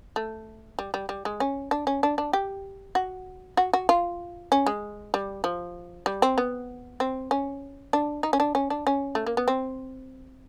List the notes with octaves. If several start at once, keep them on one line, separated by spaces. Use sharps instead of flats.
A3
G3
G3
G3
G#3
C#4
D4
C#4
D4
D4
G4
F#4
F#4
F#4
F4
C#4
G#3
G3
F3
G3
C4
B3
C4
C#4
D4
D#4
C#4
D4
C#4
D4
C#4
A3
A#3
B3
C4